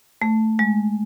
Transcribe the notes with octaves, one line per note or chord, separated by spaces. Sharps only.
A3
G#3